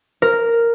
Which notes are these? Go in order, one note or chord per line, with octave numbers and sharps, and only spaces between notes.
A#4